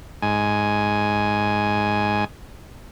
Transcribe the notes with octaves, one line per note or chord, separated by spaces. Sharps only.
G#2 G#5